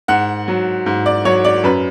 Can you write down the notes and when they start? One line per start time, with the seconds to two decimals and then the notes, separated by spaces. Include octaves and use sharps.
0.08 G#2 F#5
0.48 F#3
0.86 G#2
1.06 D5
1.25 F#3 C#5
1.44 D5
1.64 F#2 B4